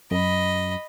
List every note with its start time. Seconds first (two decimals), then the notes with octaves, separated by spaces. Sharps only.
0.11 F#2 D#5 B5